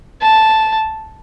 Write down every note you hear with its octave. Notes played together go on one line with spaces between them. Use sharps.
A5